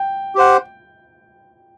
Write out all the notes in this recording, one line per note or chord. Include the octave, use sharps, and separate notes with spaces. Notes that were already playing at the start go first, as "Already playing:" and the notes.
Already playing: G5
G4 C5 F#5